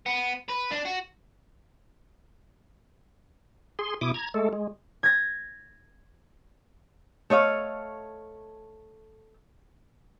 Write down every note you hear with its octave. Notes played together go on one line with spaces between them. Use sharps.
B3
B4
D4
F#4
G#4 C6
B2 E4 D6 D#6
A#5 G#6
G#3 A3 A4
G#3
G#6 A#6
A3 C#5 D#5 F5